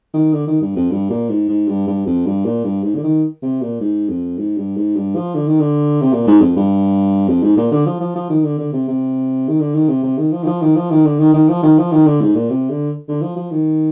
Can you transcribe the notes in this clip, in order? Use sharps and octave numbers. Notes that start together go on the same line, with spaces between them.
D#3
D3
D#3
G2
F2
G2
A#2
G#2
G#2
G2
G2
F2
G2
A#2
G2
G#2
D3
D#3
C3
A#2
G#2
F2
G#2
G2
G#2
G2
F3
D3
D#3
D3
C3
A#2
G#2
F2
G2
F2
G#2
A#2
D3
F3
F3
F3
D#3
D3
D3
C3
C3
D#3
D3
D#3
C3
C3
D#3
F3
D#3
F3
D#3
F3
D#3
D3
D#3
D#3
F3
D#3
F3
D#3
D3
G#2
A#2
C3
D3
D3
F3
F3
D#3